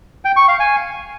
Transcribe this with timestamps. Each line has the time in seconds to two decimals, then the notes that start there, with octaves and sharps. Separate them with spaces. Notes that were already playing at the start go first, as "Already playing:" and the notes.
0.25 G5
0.37 C#6
0.48 F5
0.60 G#5